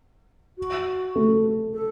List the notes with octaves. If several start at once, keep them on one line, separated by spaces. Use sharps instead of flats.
F#4
A3
A4